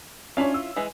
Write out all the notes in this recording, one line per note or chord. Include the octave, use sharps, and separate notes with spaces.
C#4 D4 E4 F4 C#5 F5
E6
E3 G#3